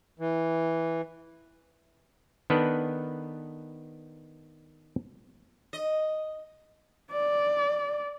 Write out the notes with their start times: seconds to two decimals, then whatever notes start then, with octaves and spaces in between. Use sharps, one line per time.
0.19 E3
2.50 D#3 B3 D4 A4 B4
5.73 D#5
7.12 D5